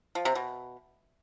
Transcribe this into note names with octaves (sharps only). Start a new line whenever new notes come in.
F3
C3
B2